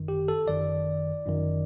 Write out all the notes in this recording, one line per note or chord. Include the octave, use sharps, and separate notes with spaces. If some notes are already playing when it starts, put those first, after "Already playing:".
Already playing: G1 F#2 D#3
G4
A4
G1 F#2 D#3 D5
G1 F#2 D#3